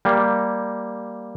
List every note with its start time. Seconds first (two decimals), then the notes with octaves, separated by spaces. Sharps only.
0.05 G3 A#3